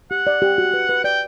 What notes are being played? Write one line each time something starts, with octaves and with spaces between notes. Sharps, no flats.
G4 F#5
D5
G4
F#4
B4
B4
D5 G5